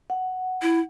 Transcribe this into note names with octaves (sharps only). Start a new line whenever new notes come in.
F#5
E4